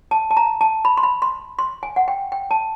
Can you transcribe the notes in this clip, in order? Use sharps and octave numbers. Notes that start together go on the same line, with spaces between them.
A5
A5
A#5
A5
B5
C6
B5
C6
C6
G#5
F#5
G5
G5
A5